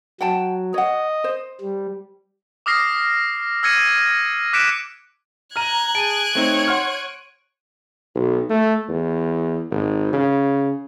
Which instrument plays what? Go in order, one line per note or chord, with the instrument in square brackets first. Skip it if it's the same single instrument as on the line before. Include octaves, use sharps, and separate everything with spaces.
[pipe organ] F#3 [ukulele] F#5 G5 A5
[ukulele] C#5 F#5 [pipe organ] D#5
[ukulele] C5
[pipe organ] G3
[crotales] D6 D#6 F6 A#6 C7
E6 F6 G#6 A#6 C#7 D#7
D6 F#6 B6 C#7 D7 E7
[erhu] A#5 [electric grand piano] F6 D#7 [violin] F#6 G#6
[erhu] G#4 [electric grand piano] A5 [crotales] D7 D#7
[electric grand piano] A3 C4 D#4 [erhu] C#5
[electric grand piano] F#5 C6 F6
[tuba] B1
A3
E2
G#1
C#3